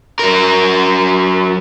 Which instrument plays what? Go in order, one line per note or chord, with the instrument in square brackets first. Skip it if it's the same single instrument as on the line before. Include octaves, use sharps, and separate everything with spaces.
[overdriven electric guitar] F#3 A#4